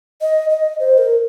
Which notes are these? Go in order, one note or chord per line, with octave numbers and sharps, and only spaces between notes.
D#5
D#5
C5
A#4